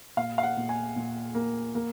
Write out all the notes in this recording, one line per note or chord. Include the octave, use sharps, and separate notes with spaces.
A#2 F5
F5
F#5
A#2
G#5
A#2
A#3
A#3